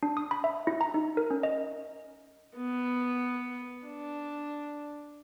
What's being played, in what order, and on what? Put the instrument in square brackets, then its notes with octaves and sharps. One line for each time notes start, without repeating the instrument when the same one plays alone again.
[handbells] D4
D#6
B5
E5
E4
A#5
D#4
A#4
C#4
D#5
[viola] B3
D4